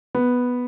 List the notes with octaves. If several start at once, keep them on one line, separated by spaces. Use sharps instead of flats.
B3